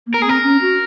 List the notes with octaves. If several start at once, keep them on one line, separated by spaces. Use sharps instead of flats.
A#3
A#4
A#3
G#4
C4 A#4
C#4
F#4